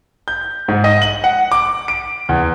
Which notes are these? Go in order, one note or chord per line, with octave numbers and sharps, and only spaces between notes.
G6
G#2
D#5
F#7
F#5
D6
D7
E2